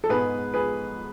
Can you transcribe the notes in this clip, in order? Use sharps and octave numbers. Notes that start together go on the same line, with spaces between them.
A4
G#2 G#3 B3 G#4 B4
G#4 B4